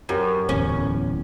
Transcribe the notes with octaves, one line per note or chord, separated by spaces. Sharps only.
F#2 G4 A#4 C#5
D1 E2 C#4